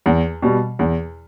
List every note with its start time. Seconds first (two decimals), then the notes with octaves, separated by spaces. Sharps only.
0.06 E2
0.42 B2 G3
0.79 E2